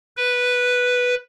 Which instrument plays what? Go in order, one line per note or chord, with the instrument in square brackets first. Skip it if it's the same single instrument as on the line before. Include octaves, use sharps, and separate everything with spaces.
[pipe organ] B4